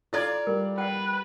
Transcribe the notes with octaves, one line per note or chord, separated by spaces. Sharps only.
E4 F4 A4 D5 A#5 G#6 A6
G3 A#4
B4 F#5 G5